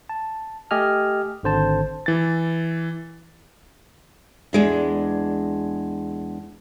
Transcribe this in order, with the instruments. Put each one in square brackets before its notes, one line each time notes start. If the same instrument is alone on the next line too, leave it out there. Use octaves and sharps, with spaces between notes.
[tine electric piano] A5
A3 G4 D#5 G#5 F6
G#1 D3 C5 A5
[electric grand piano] E3 A6
[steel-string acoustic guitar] E2 G#3 D4